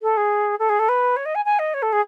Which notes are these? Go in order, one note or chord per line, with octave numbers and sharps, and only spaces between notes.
A4
G#4
A4
G#4
A4
B4
C#5
D#5
G#5
G#5
D#5
C#5
A4
G#4